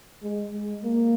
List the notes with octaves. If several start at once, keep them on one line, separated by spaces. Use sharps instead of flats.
G#3
G#3
A#3